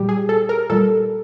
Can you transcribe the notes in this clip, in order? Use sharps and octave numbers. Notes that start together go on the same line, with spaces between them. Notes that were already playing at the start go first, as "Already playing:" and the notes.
Already playing: A#2 G3 G4
G#4
A4
A#4
A#2 G3 A4